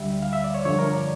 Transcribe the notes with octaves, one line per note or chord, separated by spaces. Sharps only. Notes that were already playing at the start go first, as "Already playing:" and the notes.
Already playing: D2 D3 G3 E5
F5
E5
D5
C#5
G2 D3 F3 C#5
A#4
D5